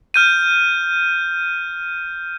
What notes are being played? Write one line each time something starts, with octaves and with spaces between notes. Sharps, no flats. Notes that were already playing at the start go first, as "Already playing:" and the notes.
F6 G6 D#7